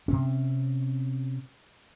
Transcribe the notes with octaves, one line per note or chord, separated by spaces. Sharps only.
C3 C4 C#4